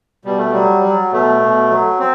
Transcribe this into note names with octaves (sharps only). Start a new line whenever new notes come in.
B2 G3
A3
F#3 G3
F#3
B2 A3
B2
F#3
C4